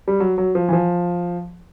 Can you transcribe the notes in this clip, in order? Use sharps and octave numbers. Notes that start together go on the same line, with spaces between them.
G3
F#3
F#3
F3
E3
F3